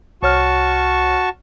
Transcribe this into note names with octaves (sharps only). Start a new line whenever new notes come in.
C2 F#4 C#5 A5 C#6 F6